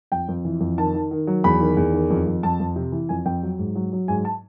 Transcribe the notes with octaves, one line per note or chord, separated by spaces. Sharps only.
F2 G5
F2
E3
F2
D#3 A5
D#3
D#3
F#3
E2 B5
D#3
E2
D#3
F2
F2
F2 A5
F2
C3
E3
F2 G#5
F2 G5
F#3
G#2
F#3
F#3
G#2 G#5
A5